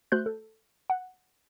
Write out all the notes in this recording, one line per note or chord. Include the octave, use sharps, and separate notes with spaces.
A3 F#4 C5 F#6 G6
A4
F#5